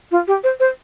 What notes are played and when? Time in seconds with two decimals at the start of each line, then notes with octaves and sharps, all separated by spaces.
0.11 F4
0.27 G4
0.44 C5
0.60 C5